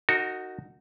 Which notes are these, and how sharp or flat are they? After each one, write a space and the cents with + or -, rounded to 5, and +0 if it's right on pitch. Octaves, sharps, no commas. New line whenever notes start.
D#4 +0 F#4 +0 A#4 -40